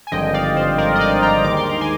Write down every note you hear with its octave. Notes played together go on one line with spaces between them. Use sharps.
G#5
G#1 G2 D3 F3 D#5 G5
D5 F5
C5
A#4 D5
D#5
D5 F5
G5 A#5
D#2 D#3 G#3 D6
C6
A#5
G#5 C6